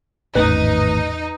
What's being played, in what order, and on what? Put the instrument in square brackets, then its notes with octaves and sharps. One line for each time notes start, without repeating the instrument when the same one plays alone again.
[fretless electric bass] G#1 A2 A3 [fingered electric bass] E2 C#4 [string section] D#4 [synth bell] B4